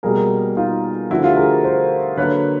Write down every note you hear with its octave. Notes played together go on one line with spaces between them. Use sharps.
B2 G3 A#3 G#4 A#4
D#4 F4
D3 F3 A3 E4 F#4
F4 G4
G#4 A#4
A#4 C5
D3 F#3 A#3 B4 C#5